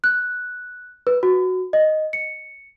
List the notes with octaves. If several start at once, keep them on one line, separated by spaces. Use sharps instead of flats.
F#6
B4
F#4
D#5
C#7